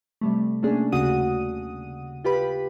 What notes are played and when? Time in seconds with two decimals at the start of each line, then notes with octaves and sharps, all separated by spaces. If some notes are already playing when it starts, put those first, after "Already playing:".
0.21 C3 G3 A3
0.63 A3 A#3 C#4 D4 G#4
0.92 D#2 C#3 F#4 F#5 D#6 D#7
2.24 F4 G4 B4 B5